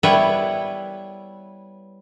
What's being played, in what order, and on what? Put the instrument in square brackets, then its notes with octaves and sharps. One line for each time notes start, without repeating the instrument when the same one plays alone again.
[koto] G3 B3 E4 B4 C#5 E5